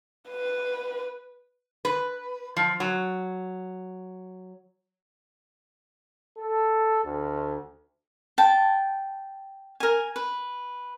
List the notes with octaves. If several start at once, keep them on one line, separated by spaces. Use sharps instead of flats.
B4
B4
F3
F#3
A4
D2
G5 A5
A#4 G#5
B4